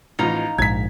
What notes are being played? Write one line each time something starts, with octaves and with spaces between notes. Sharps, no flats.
A1 F3 D#4 F5 A#5
A#1 G#2 G#6 B6